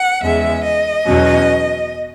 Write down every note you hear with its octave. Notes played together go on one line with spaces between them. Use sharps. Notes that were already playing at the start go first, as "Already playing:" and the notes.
Already playing: F#5
E2 C#3 G#3 E5
D#5
E2 B2 F#3 C#4